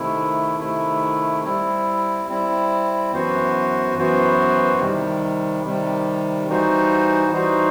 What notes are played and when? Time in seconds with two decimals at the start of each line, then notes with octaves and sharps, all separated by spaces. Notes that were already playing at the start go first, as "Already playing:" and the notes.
Already playing: C3 D#3 A3 E4
0.59 C3 D#3 A3 E4
1.44 G3 C4 E4
2.28 G3 C4 E4
3.12 F#2 E3 B3 F#4 C5
3.96 F#2 E3 B3 F#4 C5
4.80 C3 D#3 G3
5.64 C3 D#3 G3
6.48 E3 G3 D#4 F#4 C5
7.31 E3 G3 D#4 F#4 C5